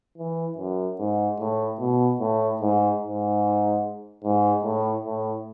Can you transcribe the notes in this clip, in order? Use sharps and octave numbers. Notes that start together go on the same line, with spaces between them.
E3
F#2
G#2
A2
B2
A2
G#2
G#2
G#2
A2
A2